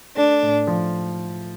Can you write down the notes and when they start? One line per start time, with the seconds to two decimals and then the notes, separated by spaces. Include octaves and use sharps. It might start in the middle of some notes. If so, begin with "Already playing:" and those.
0.16 A3 D4
0.42 A2
0.67 F3